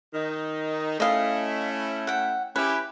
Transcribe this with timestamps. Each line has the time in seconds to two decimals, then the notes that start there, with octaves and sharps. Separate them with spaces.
0.14 D#3 D#4
1.00 A3 C#4 E4 D#5 F5
2.07 F#5 G5
2.56 C#4 E4 G4 B4